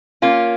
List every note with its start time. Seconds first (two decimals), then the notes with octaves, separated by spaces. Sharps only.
0.22 A#3 C#4 F4